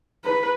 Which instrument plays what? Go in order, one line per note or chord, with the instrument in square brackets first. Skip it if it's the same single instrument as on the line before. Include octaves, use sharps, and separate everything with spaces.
[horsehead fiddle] B4